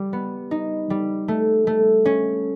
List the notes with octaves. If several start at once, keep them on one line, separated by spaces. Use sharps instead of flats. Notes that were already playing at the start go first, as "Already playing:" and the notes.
Already playing: G3
B3
D#4
G3
A3
A3
C#4